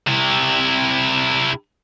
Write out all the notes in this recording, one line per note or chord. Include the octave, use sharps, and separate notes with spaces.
C3 E4